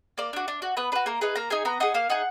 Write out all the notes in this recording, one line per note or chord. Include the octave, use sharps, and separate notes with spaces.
A#3 D5
D4 F#4
D4
F#4
B3 B4
D4 F#4 B4
A#3 A#4
D#4 G#4 B4
A#3 A#5
D#4 G#4 G#5
B3 A#5
D#4 G#4 F#5
A#3 F5
D#4 G#4 F#5